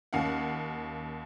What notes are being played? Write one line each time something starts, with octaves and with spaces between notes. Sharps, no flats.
D#2 C#4 F5 F#5